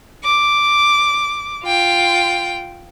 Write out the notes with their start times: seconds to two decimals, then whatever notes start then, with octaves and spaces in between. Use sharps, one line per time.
0.24 D6
1.65 F4 G5